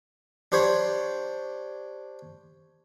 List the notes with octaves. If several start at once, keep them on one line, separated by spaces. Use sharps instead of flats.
D4 G4 C5 C#5 B5